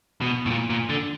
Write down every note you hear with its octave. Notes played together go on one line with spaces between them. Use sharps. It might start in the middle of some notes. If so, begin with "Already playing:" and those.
B2
A2
A#2
A#2
D3